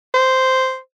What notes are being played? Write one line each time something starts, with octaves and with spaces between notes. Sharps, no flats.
C5